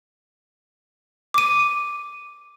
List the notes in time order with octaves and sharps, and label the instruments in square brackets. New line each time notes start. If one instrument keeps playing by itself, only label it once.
[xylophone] D6 D#7